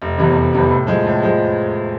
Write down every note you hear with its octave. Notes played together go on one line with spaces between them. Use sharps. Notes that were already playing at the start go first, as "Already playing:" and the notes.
F1
E2 C3 E3
F1
E2 C3 E3
A2
F3 G#3
A2
F3 G#3